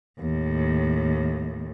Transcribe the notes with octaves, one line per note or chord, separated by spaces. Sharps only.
D#2 A2